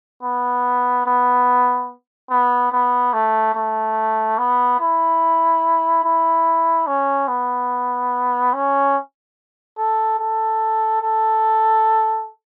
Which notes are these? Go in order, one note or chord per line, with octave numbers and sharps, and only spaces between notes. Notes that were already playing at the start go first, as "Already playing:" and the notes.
B3
B3
B3
B3
A3
A3
B3
E4
E4
C#4
B3
C#4
A4
A4
A4